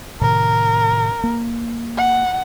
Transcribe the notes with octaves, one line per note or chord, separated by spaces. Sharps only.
A2 C3 D#3 A#4
A#3
F#5